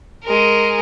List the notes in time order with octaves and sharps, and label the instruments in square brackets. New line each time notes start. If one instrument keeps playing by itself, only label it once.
[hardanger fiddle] G#3 A#4